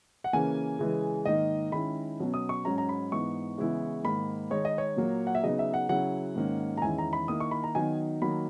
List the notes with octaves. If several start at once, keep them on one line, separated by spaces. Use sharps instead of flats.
F#5
C#3 E3 A#3 C#4 G#5
C#3 E3 G#3
G#2 D#3 A#3 D#4 D#5
D#3 G#3 C#4 E4 B5
B2 F#3 C#4
D#6
C#6
G#2 F#3 C#4 A#5
A#5
B5
G#2 E3 B3 D#4 C#6
C#3 E3 G#3 B3 E4
G#2 D#3 A#3 B5
D#3 G#3 D#4 C#5
D#5
C#5
A#2 F#3 A#3
F#5
E5
C#3 F#3 B3 D#4 D#5
E5
F#5
C#3 F#3 C#4 E4 F#5
G#2 D#3 A#3 C#4
A#5
E2 D#3 G#3 C#4 E4 G#5
A#5
B5
D#3 A#3 E4 D#6
C#6
B5
A#5
D#3 F#3 B3 D#4 G#5
D#3 F#3 A#3 B5